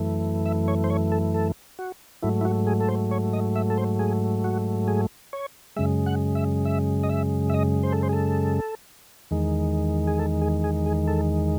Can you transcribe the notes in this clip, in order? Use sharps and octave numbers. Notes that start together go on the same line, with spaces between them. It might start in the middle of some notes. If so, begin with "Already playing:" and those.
Already playing: F#2 E3 A3
E5
C#5
C5
C#5
A4
A4
F#4
G#2 F#3 A3 E4
E4
F#4
G#4
A4
C5
C#5
D#5
E5
A4
C5
G#4
F#4
G#4
C#5
F#2 C#3 G#3 E5
F#5
E5
E5
D#5
E5
E5
D#5
C5
A4
C5
G#4
A4
E2 D#3 G#3
G#4
A4
G#4
G#4
G#4
A4